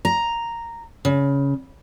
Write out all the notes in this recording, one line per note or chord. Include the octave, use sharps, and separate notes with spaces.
A#5
C#3